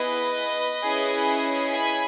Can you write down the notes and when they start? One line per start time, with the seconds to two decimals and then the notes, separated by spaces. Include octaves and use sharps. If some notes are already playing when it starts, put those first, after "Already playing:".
Already playing: B3 E4 G#4 B4 D#5
0.83 C#4 E4 G#4
1.72 G#5 B5